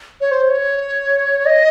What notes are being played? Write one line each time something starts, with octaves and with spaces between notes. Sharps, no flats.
C#5
C5
C#5
D#5